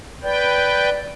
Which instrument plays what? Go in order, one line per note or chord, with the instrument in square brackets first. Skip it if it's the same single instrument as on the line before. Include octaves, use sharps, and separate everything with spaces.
[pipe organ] B4 G5 [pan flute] D5